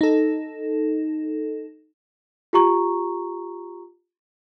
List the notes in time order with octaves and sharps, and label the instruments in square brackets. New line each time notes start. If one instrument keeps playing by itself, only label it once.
[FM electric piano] D#4 A4
[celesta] F4 G4 A#5 C#6